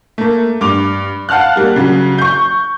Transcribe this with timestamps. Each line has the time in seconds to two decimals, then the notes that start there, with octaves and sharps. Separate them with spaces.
0.18 A3 A#3
0.61 G2 D6 F7
1.29 F5 F#5 A5 F6 F#6
1.56 G3 A#3
1.76 C#3 F#3
2.18 C#6 G6